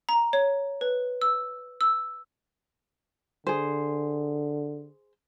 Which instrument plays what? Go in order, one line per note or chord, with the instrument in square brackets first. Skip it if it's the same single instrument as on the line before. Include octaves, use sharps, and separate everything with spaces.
[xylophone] A#5
C#5
B4
E6
E6
[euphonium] D3 [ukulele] G#4 C5